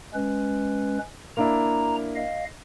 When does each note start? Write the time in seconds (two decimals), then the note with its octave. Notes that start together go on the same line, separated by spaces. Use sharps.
0.14 G#3 C#4 B4
1.37 A#3 D4 E4 A#5
2.16 D#5 F5